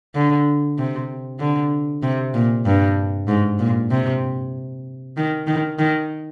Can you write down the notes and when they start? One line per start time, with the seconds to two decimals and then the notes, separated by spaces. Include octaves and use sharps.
0.15 D3
0.78 C3
1.40 D3
2.03 C3
2.34 A#2
2.66 G2
3.28 G#2
3.59 A#2
3.90 C3
5.17 D#3
5.47 D#3
5.79 D#3